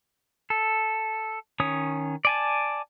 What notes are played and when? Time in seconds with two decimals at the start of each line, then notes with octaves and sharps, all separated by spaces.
0.50 A4
1.60 D#3 C#4 C#5 D#6
2.25 D5 G#5 A5